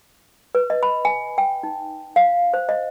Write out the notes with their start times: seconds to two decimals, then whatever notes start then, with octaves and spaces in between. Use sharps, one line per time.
0.55 B4
0.70 D#5
0.83 B5
1.05 G#5
1.38 G5
1.63 D#4
2.16 F5
2.54 C5
2.69 D#5